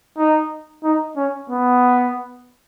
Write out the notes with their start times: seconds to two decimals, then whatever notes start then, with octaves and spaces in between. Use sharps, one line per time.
0.18 D#4
0.84 D#4
1.16 C#4
1.50 B3